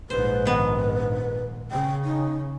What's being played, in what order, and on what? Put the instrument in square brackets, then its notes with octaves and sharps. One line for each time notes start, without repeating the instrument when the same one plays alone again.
[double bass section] A#1 G#2 [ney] B4 [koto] C5
[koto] D#3 B3
[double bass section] C#3 [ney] G5
[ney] D#4